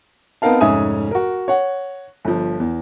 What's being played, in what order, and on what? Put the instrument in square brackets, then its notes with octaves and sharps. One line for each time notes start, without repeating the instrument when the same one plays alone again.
[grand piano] B3 C4 D#4 A#4 F5 A5
F1 G#2 C#4 E5 G#5 D#6
F#4 A#4
C#5 F#5
G1 F3
E2